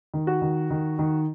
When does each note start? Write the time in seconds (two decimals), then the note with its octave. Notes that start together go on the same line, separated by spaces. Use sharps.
0.14 D#3
0.27 F#4
0.42 D#3
0.71 D#3
0.99 D#3